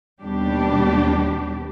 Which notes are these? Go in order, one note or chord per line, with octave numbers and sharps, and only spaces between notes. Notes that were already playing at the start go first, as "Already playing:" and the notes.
D#2 B2 G3 D4 G4